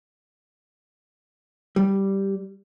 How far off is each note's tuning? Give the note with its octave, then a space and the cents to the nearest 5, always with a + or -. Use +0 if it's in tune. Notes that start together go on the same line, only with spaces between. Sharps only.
G3 -5